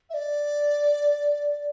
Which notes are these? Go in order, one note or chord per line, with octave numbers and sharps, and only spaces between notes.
E5
D5